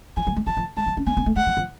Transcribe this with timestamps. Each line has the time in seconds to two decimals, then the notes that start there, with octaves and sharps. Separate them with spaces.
0.17 F3 G#5
0.27 F#3
0.36 G#3
0.47 F3 A5
0.57 F3
0.77 G#3 A5
0.86 F#3
0.97 C#4
1.07 B3 G#5
1.17 B3
1.26 A3
1.36 G#3 F#5
1.47 F3
1.57 F3